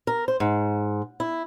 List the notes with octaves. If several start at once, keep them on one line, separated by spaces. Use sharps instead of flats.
A#4
C5
G#2
E4